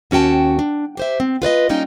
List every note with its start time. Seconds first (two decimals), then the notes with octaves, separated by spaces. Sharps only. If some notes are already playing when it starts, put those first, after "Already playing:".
0.11 D#2 C#4 F#4 G5 A5
0.59 D4
0.97 G4 C5 E5
1.20 C4
1.42 F4 B4 D5 D#5
1.69 G3 A#3 C#4 D#4 F4 G5